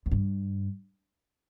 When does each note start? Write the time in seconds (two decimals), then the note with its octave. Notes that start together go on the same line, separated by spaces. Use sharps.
0.06 E2
0.11 G2